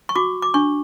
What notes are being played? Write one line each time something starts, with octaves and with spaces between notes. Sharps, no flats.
C#6
F#4 D6
D6
D4 C#6